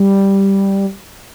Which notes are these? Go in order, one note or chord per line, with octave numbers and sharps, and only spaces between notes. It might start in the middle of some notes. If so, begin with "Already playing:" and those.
Already playing: G3